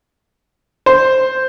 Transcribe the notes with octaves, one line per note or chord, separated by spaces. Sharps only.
C5